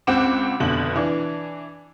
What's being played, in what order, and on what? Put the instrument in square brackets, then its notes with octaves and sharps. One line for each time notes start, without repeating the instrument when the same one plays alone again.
[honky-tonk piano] C#2 C4 F#5 D6 F#6 E7
F1 B2 D3 F#7
E3 D4